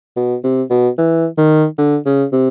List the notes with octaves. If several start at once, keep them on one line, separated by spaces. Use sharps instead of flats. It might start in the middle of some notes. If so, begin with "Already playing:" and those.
B2
C3
B2
E3
D#3
D3
C#3
C3